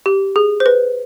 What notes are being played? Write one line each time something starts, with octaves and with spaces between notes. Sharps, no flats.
G4
G#4
C5
B4